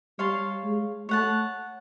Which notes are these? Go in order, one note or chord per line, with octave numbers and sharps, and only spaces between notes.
G3 C#5 F5 A5 C6
G#3
A3 C#5 F#5 A5